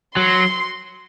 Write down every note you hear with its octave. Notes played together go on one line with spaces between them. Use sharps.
F#3 C6